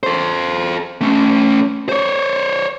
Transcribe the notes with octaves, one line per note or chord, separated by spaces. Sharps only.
A4 C5
A3 C#4
C5 C#5